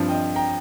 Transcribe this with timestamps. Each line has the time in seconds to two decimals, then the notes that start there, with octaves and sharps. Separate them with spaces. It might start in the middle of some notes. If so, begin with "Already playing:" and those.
Already playing: G2 F3 C4
0.09 D#5 G5
0.36 G5 A#5